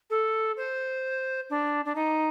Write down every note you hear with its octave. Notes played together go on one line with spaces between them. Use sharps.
A4
C5
D4
D4
D#4